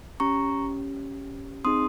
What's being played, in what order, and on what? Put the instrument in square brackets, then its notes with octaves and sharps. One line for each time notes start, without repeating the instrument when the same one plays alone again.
[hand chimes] C#4 G4 A#5 C#6
C4 D#4 G#4 C6 D#6